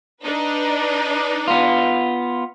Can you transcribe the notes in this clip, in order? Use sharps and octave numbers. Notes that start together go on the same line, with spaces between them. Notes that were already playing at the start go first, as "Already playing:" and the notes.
D4 D#4 B4
B3 F4